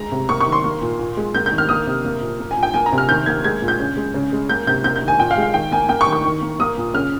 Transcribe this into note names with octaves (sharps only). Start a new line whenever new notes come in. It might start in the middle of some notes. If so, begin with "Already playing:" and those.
Already playing: G#3 A#5
C3
A#3 C#6
C#6
D#3
C6
A#3
A#2
A#2
G#3
A#3 G6
G6
D#3
F6
A#3 D#6
C3
A#3
A#2
A#3
G#5
A#2
G5
A#3 G#5
A#5
C3
F6
D#3 G6
A#3 G#6
G#3 G#6
A#2
G6
C#3
G#3
C#3
G#3
A#3 G6
C3 G6
A#3 G6
G6
D#3
G#5
A#2 G5
F5
G#3
F5
D#3 G5
A#3 G#5
A#3 G5
C#6
D#3
C#6
D#3
A#3
A#3 D#6
A#2
C#3 F6